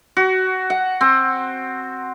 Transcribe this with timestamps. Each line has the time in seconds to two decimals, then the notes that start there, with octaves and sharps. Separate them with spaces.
0.17 F#4
0.70 F#5
1.01 C4